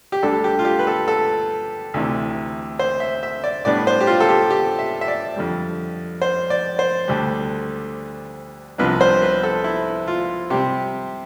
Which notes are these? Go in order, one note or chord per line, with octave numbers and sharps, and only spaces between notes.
G4
D2 D3 G3 D4 A4
G4
F4
G4
B4
A4
A4
D2 C3 E3
C5
E5
E5
D5
A2 G3 B3 D4 D5
C5
G4
F4
A4
G4
G4
E5
E5
D5
F2 D3 G3
C5
D5
C5
D2 D3 G3 D4
C2 C3 F3 B3 D4 B4
C5
B4
A4
E4
F4
C3 G3 C4 G4